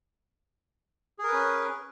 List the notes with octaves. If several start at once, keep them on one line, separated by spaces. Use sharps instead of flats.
C#4 G#4 A#4 B4